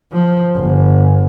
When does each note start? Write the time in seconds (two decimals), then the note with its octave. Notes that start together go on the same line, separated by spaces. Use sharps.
0.12 F3
0.55 G1